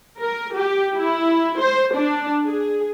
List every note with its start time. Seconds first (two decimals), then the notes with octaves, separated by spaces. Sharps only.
0.19 A#4
0.55 G4
0.97 E4
1.60 C5
1.96 D4
2.46 G#4